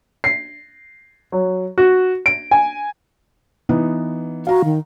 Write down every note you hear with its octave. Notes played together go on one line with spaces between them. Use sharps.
C7
F#3
F#4
D7
G#5
E3 B3 D#4
F#4 F5 A#5
D#3